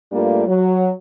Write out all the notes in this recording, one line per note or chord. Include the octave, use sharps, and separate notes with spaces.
G2 G3 A3 A#3 D4 F4
F#3